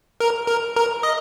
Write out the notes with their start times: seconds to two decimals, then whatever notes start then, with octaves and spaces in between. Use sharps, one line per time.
0.20 A#4
0.47 A#4
0.76 A#4
1.03 D#5